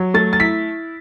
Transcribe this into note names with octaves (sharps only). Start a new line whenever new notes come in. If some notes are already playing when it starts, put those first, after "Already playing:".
Already playing: F#3
A3 A6
A6
E4 B6